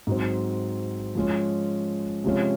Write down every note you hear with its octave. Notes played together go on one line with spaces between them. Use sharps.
G#2 F#3 C4
F3 G#3 C#4
C3 F3 G#3 C#4